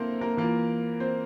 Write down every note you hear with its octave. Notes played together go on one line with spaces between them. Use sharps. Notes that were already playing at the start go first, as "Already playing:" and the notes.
Already playing: D3 A#3 C4 E4 A4 A#4 C5
A#3 A#4
E3 A#3 F4
C4 C5